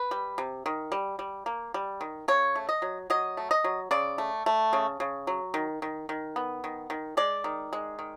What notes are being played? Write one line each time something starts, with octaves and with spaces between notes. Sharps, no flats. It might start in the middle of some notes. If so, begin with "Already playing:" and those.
Already playing: B4
G3
C3
D#3
G3
G3
A#3
G3
D#3
C#3 C#5
A3
D#5
F#3
F#3 D#5
A3
D#5
F#3
C#3 D5
A3
A3
C#3
C#3
F#3
D#3
D#3
D#3
B3
D#3
D#3
G#3 D5
D#3
G#3
D#3